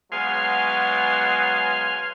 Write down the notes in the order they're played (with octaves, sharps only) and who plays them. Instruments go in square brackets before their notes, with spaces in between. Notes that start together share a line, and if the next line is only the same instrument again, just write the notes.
[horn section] F#3 G#3 B3 [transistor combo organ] F5 G#5 C6